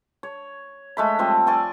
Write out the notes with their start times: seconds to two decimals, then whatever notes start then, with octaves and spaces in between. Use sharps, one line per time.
0.23 C#5
0.97 G#3 A3 B5
1.19 F3 G3 C4
1.47 D5 G#5 C6 C#6